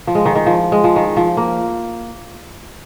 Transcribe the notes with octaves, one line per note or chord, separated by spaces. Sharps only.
F3
G#3
D#3
D#3
F3
G#3
F3
D#3
F3
A#3